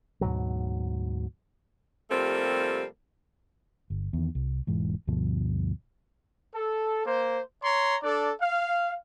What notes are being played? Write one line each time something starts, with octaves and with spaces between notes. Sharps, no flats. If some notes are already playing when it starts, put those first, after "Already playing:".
D2 G#2 B2 F#3
C3 F3 G3 A3 A#3 C4
G1
E2 D#3
C2
E1 G#2 E3
D2 G2 B2 F3
A4
A#3 C5
C#5 A#5 C6
D4 A4 D5
F5